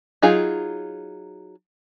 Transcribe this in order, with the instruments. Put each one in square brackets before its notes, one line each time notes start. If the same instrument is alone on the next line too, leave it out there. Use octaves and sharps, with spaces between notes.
[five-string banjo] F#3 D#4 F4 G#4